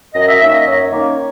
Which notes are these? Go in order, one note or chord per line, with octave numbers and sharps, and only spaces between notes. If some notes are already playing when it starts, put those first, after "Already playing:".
F#2 D#5
E5
D#3 A#3 C#4 E5
D#5
F#2 C#5
D#3 A#3 C#4